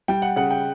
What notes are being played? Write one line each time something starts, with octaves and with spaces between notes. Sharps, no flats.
G3 G5
F#5
C#3 F#5
G5